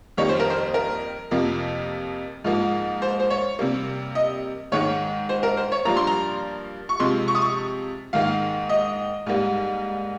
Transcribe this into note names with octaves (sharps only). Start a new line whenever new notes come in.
F2 D#3 G3 A#3 C#5
C5
A#4
C5
A#4
F2 C3 F3 A#3
G#2 F3 A#3
C5
C5
C#5
C3 G3 A#3
D#5
G#2 D#3 G#3 C#5
C5
A#4
C5
C#5
G2 F3 A#3 A#5
C6
A#5
C#6
C3 F3 G#3 C6
C#6
D#6
C#6
G#2 D#3 A#3 F5
D#5
G#2 G3 A#3